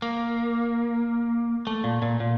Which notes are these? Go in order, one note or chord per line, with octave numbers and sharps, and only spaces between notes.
A#3
A3
A#2
A#2
A#2